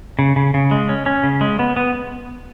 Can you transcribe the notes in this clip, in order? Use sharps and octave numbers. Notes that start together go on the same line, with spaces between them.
C#3
C#3
C#3
G#3
C#4
C#4
C#3
G#3
B3
B3